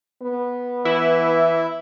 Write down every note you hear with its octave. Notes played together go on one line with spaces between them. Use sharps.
B3
E3 E4